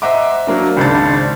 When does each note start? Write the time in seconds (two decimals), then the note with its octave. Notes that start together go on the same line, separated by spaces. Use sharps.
0.02 C5 D#5 E5 F#5 A#5 D6
0.47 F#3 A#3 D4
0.77 G#1 C#2 D4 C5 A5 A6